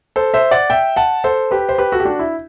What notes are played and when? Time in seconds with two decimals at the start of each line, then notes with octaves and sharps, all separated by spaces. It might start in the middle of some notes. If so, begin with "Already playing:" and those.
0.16 A4 C5
0.34 C5 E5
0.51 D5 F#5
0.70 E5 G5
0.96 F#5 A5
1.24 A4 C5
1.51 G4 B4
1.69 C5
1.78 G4 B4
1.92 F#4 A4
2.00 G4
2.05 D4 F#4
2.19 E4